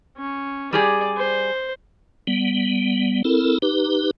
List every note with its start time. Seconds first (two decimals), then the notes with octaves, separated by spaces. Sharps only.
0.17 C#4
0.73 G3 G4 G#4 D5
1.17 C5
2.27 G3 B3
3.24 C4 E4 A4 A#4
3.62 D#4 G4 B4